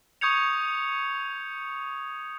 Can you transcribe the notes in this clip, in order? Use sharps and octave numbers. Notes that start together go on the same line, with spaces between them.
C#6 D#6 G6 G#6 C#7 F7